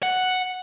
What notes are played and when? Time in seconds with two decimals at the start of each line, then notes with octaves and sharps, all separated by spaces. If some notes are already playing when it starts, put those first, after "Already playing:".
0.03 F#5